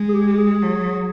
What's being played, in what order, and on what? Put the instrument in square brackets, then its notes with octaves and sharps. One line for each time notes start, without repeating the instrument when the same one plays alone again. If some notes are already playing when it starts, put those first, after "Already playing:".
Already playing: [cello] G#3
[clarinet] G#4
G4
G#4
[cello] F#3